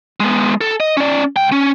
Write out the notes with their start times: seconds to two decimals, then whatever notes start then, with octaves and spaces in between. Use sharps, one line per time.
0.20 G#3 B3
0.61 A4
0.80 D#5
0.97 C#4 D5
1.36 C#2 G5
1.52 C#4